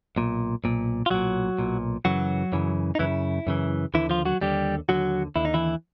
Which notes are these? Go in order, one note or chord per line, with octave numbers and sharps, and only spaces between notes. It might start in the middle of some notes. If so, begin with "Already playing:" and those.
B1 A#2
B1 A#2
F4
B1 A#2 F#3 F#4
B1 A#2
F#2 C#3 E3 F#3 F#4
F#2 C#3 E3
D#4
F#2 C#3 E3 E4
F#2 C#3 E3
D#2 D3 E3 E4
F3 F4
F#3 F#4
D#2 D3 G3 G4
D#2 D3 F#3 F#4
D#2 D3 E4
D#4
E3 E4